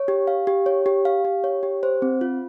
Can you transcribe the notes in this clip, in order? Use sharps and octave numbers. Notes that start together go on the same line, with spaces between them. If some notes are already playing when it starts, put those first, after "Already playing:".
Already playing: C#5
G4
F5
G4
C#5
G4
F5
G4
C#5
G4
C5
C4
F4